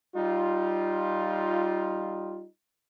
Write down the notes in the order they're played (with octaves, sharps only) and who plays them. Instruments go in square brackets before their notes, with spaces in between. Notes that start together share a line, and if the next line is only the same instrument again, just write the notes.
[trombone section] G3 D#4 F4